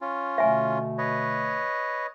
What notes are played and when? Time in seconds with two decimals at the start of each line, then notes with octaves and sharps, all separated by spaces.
0.01 C#4 F4
0.38 B2 D3 A3 E5 G#5
0.98 B4 C#5 D#5